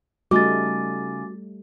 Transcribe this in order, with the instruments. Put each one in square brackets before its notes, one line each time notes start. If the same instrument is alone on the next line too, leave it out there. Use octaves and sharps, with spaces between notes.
[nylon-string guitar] C#3 D#4 [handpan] G3 A3 [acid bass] F#4 [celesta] D6 A6